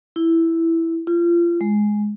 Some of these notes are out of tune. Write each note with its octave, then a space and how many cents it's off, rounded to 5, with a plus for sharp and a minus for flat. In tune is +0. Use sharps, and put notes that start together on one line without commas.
E4 +0
F4 -30
G#3 +5